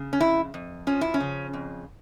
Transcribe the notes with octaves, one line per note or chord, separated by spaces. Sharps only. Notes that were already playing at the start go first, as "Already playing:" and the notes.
Already playing: C#3
C#4
F2 E4
F2
F3 C#4
E4
C#4
C#3
F2